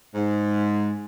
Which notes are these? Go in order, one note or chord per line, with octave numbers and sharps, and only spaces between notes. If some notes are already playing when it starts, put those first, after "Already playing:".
G#2